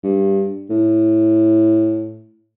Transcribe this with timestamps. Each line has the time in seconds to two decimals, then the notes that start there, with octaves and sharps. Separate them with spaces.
0.03 G2
0.70 A2